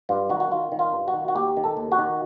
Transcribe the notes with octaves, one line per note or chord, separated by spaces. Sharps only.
G2 F4
D#3 F#4
F#4
D#3 F4
D#3
F4
G2
F#4
D#3
F#4
D#2 G4
D#3
A4
D#2
F#4
D#3